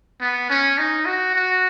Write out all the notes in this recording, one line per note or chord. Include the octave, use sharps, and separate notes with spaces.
B3
C#4
D#4
F#4
F#4